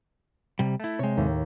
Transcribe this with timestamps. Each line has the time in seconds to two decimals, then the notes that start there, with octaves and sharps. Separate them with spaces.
0.59 C3 G3
0.80 A3 E4
0.99 C3 G#3 C#5 G5
1.17 D#2 A2